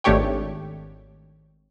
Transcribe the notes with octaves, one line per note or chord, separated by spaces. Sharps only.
G#1 A3 D4 G4 C#5 G5